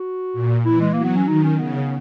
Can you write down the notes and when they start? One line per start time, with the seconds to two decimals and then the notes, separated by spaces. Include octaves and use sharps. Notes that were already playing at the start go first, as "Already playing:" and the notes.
Already playing: F#4
0.34 A#2
0.65 E3 E4
0.81 G#3
0.93 F#3 A#3
1.04 B3
1.16 C#4
1.28 D#3 D#4
1.44 C#4
1.59 C#3 B3